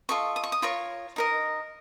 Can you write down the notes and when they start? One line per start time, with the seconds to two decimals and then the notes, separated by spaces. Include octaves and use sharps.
0.09 F4 A4 D#5 C#6
0.36 D#6
0.44 C#6
0.52 D#6
0.62 F4 A#4 C#5 C#6
1.16 D#4 A#4 D#5